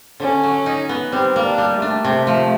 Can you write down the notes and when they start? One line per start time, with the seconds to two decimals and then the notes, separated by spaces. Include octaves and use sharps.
0.20 D3 C#4
0.44 F#3
0.66 D#4
0.89 B3
1.12 G3 C4
1.36 A#3
1.42 D4
1.58 G3
1.74 A3
1.82 D4
2.05 C3
2.27 F3